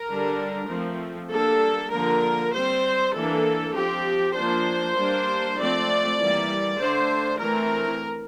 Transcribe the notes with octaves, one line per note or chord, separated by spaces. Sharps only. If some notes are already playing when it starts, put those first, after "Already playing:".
Already playing: A#4
D3 G3 D4
F3 A3 C4
G3 A#3 D4 A4
D3 F3 A#3 A#4
G3 C4 C5
E3 A#3 D4 A4
F3 C4 G4
F3 A#3 D4 C5
G3 A#3 D4
F3 A3 C4 D5
E3 G3 A#3
D3 A3 D4 C5
E3 A3 C4 A#4